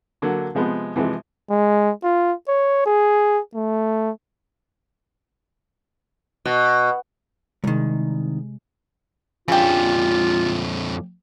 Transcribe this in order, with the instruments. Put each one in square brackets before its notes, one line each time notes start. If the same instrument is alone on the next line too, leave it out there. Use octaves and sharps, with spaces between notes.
[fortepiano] D3 F#3 A#3
C3 F3 G#3 B3
C3 E3 F3 G#3
[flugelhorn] G#3
F4
C#5
G#4
A3
[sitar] B2
[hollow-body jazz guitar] C2 D#3 [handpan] C3 G#3
[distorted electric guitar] F2 D4 [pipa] C#3 G4 [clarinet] F4